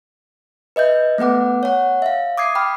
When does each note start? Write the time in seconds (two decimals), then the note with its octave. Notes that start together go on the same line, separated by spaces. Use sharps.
0.76 B4 D#5 E5 G6
1.18 A3 B3 B4 F#5 D6
1.63 C#5 F#5
2.02 E5 F5
2.38 D6 D#6 G#6 C7
2.55 G5 B5 D6 F6